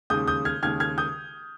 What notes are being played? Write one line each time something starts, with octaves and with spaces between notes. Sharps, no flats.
D#2 C#3 G#3 D#6 G6
D#6 G6
F6 G#6
D#2 C#3 G#3 F6 G#6
F6 G#6
D#6 G6